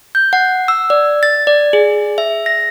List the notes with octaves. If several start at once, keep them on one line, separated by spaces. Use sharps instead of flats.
G6
F#5
E6
D5
A6
D5
G#4
E5
A#6